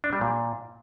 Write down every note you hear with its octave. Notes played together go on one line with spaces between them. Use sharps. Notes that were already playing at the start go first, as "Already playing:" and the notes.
D4
G3
A#2